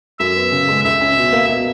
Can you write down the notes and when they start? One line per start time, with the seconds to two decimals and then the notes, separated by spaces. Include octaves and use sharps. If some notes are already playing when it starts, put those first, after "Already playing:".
0.20 F#2 E5
0.36 B3
0.52 C#3
0.69 G#3
0.84 C#2 E5
1.01 C#4
1.17 B2
1.33 A#3
1.49 B2